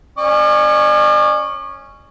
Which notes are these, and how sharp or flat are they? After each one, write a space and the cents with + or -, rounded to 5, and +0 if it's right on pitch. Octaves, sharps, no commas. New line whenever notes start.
C#4 -5 D5 +45 C#6 +5